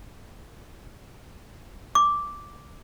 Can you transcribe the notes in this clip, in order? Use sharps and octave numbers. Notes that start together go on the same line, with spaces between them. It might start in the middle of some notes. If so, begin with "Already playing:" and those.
D6